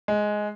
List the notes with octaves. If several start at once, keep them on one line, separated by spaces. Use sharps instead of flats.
G#3